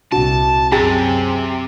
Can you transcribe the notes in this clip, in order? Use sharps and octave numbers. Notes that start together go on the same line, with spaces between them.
C2 C3 F#4 A5
F#2 C3 G4 G#4 A#5 A6